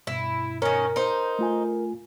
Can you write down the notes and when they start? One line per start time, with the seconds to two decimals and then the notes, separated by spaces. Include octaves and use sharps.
0.07 G2 B2 E4
0.62 D#3 C#4 A#4
0.96 D#4 C5
1.39 A3 F4 G#5